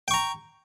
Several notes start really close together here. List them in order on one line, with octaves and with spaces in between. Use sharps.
G5 C#6 A#5